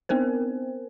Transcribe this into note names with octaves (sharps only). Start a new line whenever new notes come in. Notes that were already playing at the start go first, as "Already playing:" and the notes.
B3 C4 A#4 C5